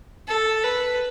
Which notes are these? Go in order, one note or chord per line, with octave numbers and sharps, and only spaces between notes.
A4
B4